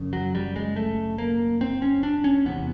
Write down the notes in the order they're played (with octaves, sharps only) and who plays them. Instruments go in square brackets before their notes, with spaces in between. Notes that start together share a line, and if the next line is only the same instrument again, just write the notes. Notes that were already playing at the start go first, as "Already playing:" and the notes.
Already playing: [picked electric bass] F#2 C#3
F#3
G3
G#3
A3
A#3
C4
C#4
D4
C#4
E2 C3 B3